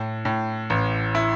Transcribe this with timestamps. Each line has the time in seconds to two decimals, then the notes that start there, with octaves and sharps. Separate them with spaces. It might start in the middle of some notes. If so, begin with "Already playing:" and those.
Already playing: A2
0.25 A2
0.70 A1
1.15 E4